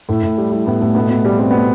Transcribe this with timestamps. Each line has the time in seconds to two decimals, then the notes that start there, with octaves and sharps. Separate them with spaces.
0.09 A2 E4
0.23 A2
0.38 G3
0.52 G3 E4
0.67 A2 B3
0.81 A2 A3
0.95 B2 B3
1.10 B2
1.25 G3
1.39 G3 C4
1.51 B2 B3